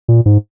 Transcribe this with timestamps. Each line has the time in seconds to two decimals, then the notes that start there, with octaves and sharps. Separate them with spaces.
0.08 A#2
0.26 G#2